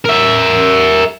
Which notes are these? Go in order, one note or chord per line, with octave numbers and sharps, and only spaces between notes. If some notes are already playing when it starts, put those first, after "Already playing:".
A#4 E5